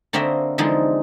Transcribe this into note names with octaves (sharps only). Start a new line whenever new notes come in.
D3 A#3 C4 F#4 D#5 E5
D3 E3 F3 G#3 C4 D#4